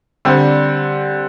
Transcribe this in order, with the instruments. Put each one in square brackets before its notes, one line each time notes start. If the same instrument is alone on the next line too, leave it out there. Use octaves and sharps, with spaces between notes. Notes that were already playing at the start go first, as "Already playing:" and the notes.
[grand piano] D3 G3 C4